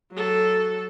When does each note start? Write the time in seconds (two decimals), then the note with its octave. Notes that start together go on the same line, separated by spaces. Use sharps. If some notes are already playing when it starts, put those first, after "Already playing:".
0.12 F#3 A4